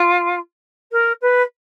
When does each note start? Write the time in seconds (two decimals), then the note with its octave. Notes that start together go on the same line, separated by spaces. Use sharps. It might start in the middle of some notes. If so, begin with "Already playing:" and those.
Already playing: F4
0.92 A#4
1.21 B4